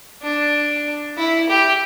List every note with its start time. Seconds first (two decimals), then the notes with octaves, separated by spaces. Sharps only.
0.22 D4
1.17 E4
1.49 G4